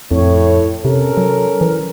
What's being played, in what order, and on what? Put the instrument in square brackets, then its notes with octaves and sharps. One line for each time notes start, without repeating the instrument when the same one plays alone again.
[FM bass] F2 [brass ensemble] A2 C#5
[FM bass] C3 [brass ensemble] C#4 A4 A#4
[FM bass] F#3
E3